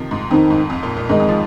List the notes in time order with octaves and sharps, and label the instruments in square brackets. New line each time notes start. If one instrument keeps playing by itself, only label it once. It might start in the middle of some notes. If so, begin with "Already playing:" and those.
Already playing: [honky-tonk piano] C3 D#3 F3
G#2
[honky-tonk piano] F2 [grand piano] D#3 C4 D#4
[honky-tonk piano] G#2
F2
A#2
A#2
[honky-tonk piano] G#2 [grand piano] D#3 G#3 D#4 A#4 D#5
[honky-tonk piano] F2
F3